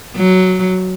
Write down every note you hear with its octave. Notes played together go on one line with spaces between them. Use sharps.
F#3